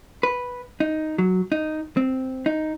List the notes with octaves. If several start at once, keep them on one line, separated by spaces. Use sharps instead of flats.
B4
D#4
F#3
D#4
C4
D#4